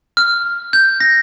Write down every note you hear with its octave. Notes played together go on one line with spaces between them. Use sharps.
F6
G6
A#6